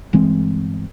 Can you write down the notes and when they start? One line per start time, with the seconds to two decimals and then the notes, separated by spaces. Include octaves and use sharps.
0.13 G1 E3 G#3 C4